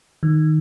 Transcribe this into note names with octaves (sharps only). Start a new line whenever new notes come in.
D#3